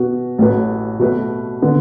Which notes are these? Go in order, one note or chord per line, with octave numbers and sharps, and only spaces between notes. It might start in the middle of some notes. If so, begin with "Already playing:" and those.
Already playing: B2 B3 F#4
A1 A2 A3 F#4 B4
B2 A3 F#4 B4
D3 B3